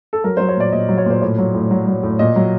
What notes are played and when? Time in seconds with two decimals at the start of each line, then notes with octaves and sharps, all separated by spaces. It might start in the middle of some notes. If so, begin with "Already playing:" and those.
0.13 A4
0.24 F#3 A#4
0.37 F#3 C5
0.49 C#5
0.57 A#2 D5
0.72 A#2 D#5
0.89 F#3
0.98 C#5
1.06 A#2 C5
1.22 A2 C#5
1.38 F#3
1.54 A2
1.71 F#3
1.88 F#3
2.03 A2
2.19 A#2 D#5
2.36 F#3